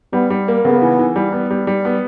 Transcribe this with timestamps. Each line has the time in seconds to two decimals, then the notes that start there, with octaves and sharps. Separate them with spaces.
0.13 G3 B3
0.30 G3
0.48 A#3
0.65 C#3 B3
0.82 E3
0.99 E3
1.16 G3
1.32 B3
1.51 G3
1.67 G3
1.85 B3